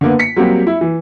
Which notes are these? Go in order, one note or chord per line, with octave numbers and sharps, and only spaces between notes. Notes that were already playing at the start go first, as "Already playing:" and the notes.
D3 A#3 B3
B6 C#7
F#3 G3 A#3 C4 G4
E4
E3